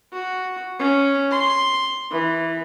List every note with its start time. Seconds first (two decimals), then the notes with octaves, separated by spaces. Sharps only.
0.13 F#4
0.79 C#4
1.32 C6
2.11 E3